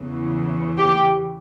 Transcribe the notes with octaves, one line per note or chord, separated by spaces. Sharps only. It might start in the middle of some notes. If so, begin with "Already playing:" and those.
Already playing: E2 C#3 E3
G4